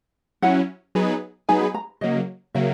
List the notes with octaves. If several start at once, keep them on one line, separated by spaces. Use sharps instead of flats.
F#3 C#4 E4 F#5
F#3 B3 D#4 G#4 B4
F#3 B3 D#4 G#4 B4 G#5
B5
A#5
C#3 F#3 A#3 D#5
C#3 F#3 A#3 E5